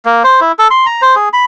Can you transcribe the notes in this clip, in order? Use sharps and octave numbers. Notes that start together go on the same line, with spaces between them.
A#3
C5
E4
A4
C6
A#5
C5
G#4
B5